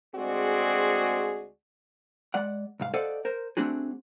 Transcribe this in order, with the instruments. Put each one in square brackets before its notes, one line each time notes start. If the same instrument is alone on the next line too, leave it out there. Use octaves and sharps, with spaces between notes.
[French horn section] D2 G#3 C4 F#4 G#4 D5
[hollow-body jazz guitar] G#3 D5 F#5
C2 G#2 F5
A4 C5 D5 D#5 F5 F#5
A#4 C5
A3 C4 D4 F#4 G#4